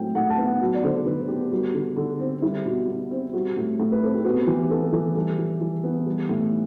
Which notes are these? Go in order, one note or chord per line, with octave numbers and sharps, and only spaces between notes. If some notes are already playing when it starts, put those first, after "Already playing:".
Already playing: A2 F#3 C4 G5
A2 F#5
A5
B3
F#5
F#3
D5
D3 C5
D3 B4
B3 G4
G3 F#4
D3
D3
C4
G3 E4
B2
B2
C4
G3 F#4
A2
A2
B4
C4 A4
G4
B3 F#4
E3 G4
B3 A4
E3 A4
G3 A4
E3
E3
B3
G3
A2